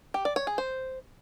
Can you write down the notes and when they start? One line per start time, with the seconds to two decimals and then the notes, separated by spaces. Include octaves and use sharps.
0.14 G4
0.25 D5
0.36 C#5
0.47 G#4
0.58 C5